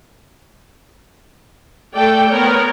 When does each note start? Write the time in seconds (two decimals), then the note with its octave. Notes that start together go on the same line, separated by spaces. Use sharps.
1.95 A3 A4 D5 G5
2.29 B3 A#4 C#5